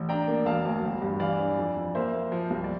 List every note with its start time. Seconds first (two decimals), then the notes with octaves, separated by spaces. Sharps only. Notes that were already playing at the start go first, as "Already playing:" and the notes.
Already playing: A1
0.09 D4 G5 A#5
0.28 A#3
0.46 E1 F5 A5
0.65 D2
0.83 G1
1.02 G2
1.20 E3 D5 F5
1.39 D4
1.57 F2
1.76 F2
1.95 A#3 C5 E5
2.14 A#3
2.32 F3
2.50 C2
2.64 D5